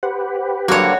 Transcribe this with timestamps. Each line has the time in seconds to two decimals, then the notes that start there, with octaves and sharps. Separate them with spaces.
0.03 G4 B4 C5 F#5
0.68 G2 D3 F#3 A#3 F#4 C#5